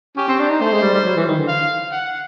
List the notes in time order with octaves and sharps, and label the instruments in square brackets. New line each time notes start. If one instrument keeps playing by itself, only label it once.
[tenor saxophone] C#4 [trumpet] G4
[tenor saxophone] C4
D4
D#4
[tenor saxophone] A3 [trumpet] C5
[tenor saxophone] G#3
G3
G3
F#3
E3
D#3
D3
[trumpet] F5
F#5